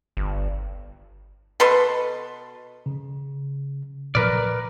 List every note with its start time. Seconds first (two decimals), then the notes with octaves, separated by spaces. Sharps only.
0.17 G1
1.60 B2 A4 B4 C6
2.86 C#3
4.15 A#2 F3 F#3 A#4 B4 D5 F6